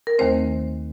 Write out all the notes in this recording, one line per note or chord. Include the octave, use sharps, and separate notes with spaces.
A#4
D#2 D#3 A3 C4 C5